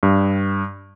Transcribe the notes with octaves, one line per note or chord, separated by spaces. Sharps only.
G2